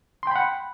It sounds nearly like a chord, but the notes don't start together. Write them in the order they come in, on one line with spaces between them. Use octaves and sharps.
C6 G5 B5 F#5